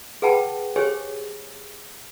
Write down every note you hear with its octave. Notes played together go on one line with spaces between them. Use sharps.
G#4 B4 F#5 G5 A5 B5
G4 G#4 C5 C#5 G#5